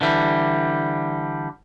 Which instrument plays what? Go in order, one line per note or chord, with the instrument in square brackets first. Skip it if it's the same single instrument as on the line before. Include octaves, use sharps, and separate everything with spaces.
[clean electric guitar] D3 E3 G3